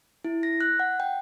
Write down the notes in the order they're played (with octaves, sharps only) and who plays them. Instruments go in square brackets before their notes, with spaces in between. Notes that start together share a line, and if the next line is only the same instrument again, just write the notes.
[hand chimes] E4
A#6
F#6
F#5
G5